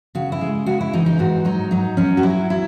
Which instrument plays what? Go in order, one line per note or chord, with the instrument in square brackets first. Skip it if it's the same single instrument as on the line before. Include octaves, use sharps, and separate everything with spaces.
[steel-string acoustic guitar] C#3 F#4
E4
G#3
C#3 F#4
E4
E3 D#4
D#4
G#2 F#4
F#3 D#4
F#3 D#4
F#3 C#4
F#4
F#3 E4
E4